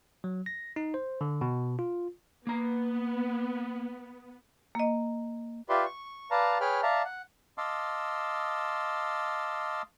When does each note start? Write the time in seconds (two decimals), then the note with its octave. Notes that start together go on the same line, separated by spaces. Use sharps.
0.24 F#3
0.46 A#6
0.76 D#4
0.94 C5
1.21 D3
1.41 B2
1.79 F4
2.47 A#3 B3 A#5
4.75 A#3 D#5
5.69 F4 G4 B4 D5 E5 C6
5.85 C#6
6.31 B4 D5 F5 A5 A#5
6.61 G#4 B4 C#5 G5 B5 F6
6.83 D5 E5 F5 A5 A#5
7.05 F#5
7.58 D#5 F5 A5 C6 D6 E6